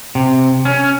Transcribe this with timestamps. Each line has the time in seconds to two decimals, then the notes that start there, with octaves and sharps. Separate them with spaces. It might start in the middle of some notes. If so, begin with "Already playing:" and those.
0.15 C3
0.65 C#4